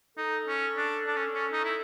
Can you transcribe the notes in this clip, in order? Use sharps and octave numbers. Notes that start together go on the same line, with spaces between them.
D#4 A4
C#4
D4
D4
C#4
C#4
D#4
E4